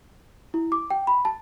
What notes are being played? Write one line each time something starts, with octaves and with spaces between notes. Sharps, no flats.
E4
D6
G5
B5
A5